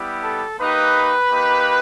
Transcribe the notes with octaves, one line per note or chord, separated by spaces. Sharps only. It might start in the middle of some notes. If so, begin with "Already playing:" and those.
Already playing: G3 B3 E4 G4
A4
A#3 D#4 G4 B4
A#3 D#4 G4